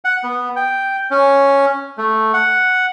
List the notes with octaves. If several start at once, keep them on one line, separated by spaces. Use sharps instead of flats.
F#5
B3
G5
C#4
A3
F#5